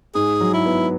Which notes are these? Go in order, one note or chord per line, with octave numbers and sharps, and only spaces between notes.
G#2 G#4
F#3
E4
B3